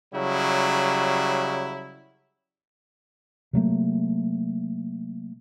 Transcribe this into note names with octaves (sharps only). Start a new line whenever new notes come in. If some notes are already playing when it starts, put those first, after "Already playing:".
C#3 F#3 G3 E4
C3 F#3 A3 A#3